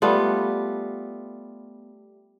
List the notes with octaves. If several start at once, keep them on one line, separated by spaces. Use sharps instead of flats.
G3 A3 B3 F4